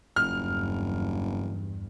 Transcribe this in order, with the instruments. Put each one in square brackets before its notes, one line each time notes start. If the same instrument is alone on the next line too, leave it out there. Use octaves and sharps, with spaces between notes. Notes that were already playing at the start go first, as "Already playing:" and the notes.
[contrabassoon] F#1 [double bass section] E2 G2 [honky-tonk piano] F6